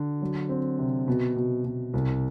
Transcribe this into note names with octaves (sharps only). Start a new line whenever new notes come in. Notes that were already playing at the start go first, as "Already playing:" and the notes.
Already playing: D3
F#3
C4
C3
B2
B2
B2
C2